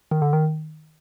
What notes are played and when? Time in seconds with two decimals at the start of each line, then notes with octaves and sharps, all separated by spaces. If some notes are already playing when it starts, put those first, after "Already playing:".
0.11 D#3
0.22 D3
0.33 D#3